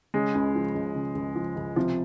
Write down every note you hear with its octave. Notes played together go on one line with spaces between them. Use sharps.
C#3 G#3
C#2
F3
C#2
C#3
C#2
F3
C#2
C3 F3